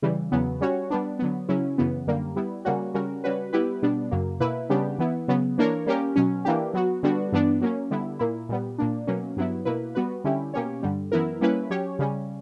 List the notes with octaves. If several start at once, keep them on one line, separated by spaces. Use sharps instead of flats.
C#3 E3 G3
E2 C#3 F#3 B3
G3 C#4 F#4 C#5
G3 B3 D4
D3 F#3 B3
C#3 F#3 C#4 E4
F#2 C#3 E3 B3
F#2 D3 G3 A#3
G3 B3 E4
C#3 G3 A#3 C#4 F#4
C#3 G3 C#4 F#4 A#4
C#3 G3 C#4 F#4 B4
G3 B3 E4 G4 B4
B2 G3 B3 D4
F#2 C#3 F#3 A#3
B2 A#3 E4 B4
C#3 G3 B3 D4 G4
E3 B3 E4
C#3 F#3 B3
E3 A#3 D4 A#4 C#5
G3 A#3 C#4 G4 A#4
B2 F#3 C#4
E3 A#3 D4 G4
F#3 B3 F#4
D3 G3 B3 D4 F#4
G2 E3 B3 D4
F#3 A#3 C#4
D3 G3 B3 E4
A#2 A#3 E4
A#2 G3 B3
A#2 A#3 D4
B2 F#3 A#3 C#4
G2 F#3 B3 E4
B2 A#3 E4 B4
G3 B3 F#4 B4
D3 G3 C#4 E4 G4
B2 A#3 C#4 G4 C#5
G2 D3 G3
F#2 E3 B3 E4 A#4
G3 A#3 C#4 E4 B4
F#3 C#4 G4 C#5
C#3 G3 C#4